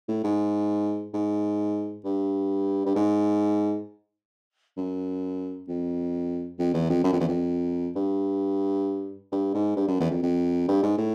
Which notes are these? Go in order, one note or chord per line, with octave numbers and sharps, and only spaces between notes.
A2
G#2
G#2
G2
G2
G#2
F#2
F2
F2
E2
F2
F#2
F2
E2
F2
G2
G2
G#2
G2
F#2
E2
F2
F2
G2
G#2
A2